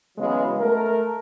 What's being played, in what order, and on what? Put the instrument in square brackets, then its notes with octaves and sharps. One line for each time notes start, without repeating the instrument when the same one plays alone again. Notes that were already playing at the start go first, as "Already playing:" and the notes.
[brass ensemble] C#3 E3 F#3 G#3 B3
A3 A#4